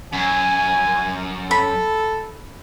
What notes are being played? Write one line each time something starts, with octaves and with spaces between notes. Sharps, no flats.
F#2 G#5
A4 B5